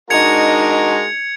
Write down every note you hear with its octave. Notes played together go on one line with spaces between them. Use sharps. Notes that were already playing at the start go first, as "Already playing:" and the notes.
G#3 D4 D#4 F#4 A#4 G#6 C#7 F7